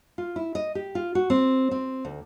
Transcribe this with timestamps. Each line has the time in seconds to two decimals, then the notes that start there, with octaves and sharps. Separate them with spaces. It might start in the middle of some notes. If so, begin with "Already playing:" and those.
0.18 F4
0.36 E4
0.55 D#5
0.75 G4
0.95 F4
1.15 F#4
1.30 C4
1.71 C4
2.05 D2